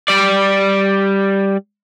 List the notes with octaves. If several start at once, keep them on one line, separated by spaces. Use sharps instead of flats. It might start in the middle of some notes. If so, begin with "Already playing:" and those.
G3 D5